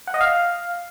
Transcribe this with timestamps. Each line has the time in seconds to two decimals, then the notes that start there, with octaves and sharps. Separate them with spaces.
0.07 F#5
0.14 D#5
0.21 F5